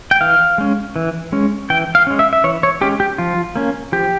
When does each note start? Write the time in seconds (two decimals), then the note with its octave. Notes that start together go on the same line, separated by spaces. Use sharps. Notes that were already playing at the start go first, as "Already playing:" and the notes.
0.11 G5
0.21 E3 F5
0.58 G#3 C#4
0.96 E3
1.32 G#3 C#4
1.70 E3 G5
1.95 F5
2.07 G#3 C#4
2.19 E5
2.33 E5
2.44 E3 C#5
2.63 C#5
2.81 G#3 C#4 G4
3.00 G4
3.18 F3 F4
3.56 A#3 C#4
3.92 F3 G4